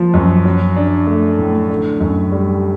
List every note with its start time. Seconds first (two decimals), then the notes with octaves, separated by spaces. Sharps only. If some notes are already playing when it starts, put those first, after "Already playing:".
Already playing: F3 A#3
0.14 F#2
0.45 F#3
0.76 D4
1.07 A3
1.38 A2
1.70 D3
2.00 F#2
2.32 G3